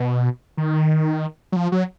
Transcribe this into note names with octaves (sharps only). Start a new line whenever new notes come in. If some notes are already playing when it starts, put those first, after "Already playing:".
Already playing: B2
D#3
F#3
F3
F#3